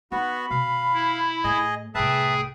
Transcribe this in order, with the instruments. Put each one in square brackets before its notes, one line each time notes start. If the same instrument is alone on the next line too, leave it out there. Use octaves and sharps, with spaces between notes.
[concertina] B3 F#4 [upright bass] D#4 [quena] B5
[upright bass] B2 [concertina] F5
[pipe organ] E4
[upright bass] A2 [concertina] G#4 D#5
[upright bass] C2 A2 [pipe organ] G#4 [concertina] B4 E5 A5 [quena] G5